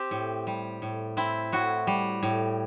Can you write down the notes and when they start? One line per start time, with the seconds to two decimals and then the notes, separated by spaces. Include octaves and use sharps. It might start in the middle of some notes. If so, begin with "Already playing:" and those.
Already playing: C4 G4
0.11 A2
0.47 G3
0.82 A2
1.17 C4 E4
1.52 A2 F#4
1.87 G3
2.23 A2